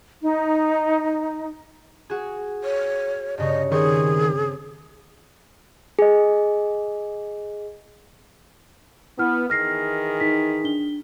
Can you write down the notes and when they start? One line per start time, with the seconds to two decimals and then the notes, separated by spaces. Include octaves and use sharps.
0.22 D#4
2.10 F#4 G#4
2.64 C#5
3.38 G2 C#3 D#5 C#6
3.72 D#3 C4 G#4 C#6
5.99 G#4 D#5
9.19 B3 E4 F6
9.50 D#3 E3 G#4 F6 A#6 C7
10.20 D#4 B6
10.64 D4 G7